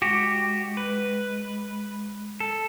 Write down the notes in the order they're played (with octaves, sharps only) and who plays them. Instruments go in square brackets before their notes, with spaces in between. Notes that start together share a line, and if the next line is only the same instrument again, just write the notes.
[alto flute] G#3 [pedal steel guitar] F#4 G4
[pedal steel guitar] B4
A4